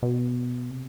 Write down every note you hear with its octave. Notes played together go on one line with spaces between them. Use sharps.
B2
C3